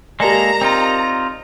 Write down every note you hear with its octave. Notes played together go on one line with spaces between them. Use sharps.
G#3 A#3 G4 A4 A#4 D5 A#5
C4 D#4 F4